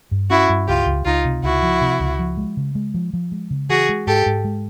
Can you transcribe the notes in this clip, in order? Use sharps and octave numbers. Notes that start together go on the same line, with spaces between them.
G2
C#4 E4 F#4
G2
C#2 F4 G4
C#2
C#2 D#4 F4
C3
C#2 E4 F#4
F3
C3
C#2
F3
G#3
C#3
G#3
F3
F3
G#3
C#3
E3 F#4 G#4
G#3
G#2 G4 A4
G#2
G#3